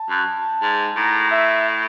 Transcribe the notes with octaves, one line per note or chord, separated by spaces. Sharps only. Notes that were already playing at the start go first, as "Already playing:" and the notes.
Already playing: A5
F#2
G#2
A2 A#5
E5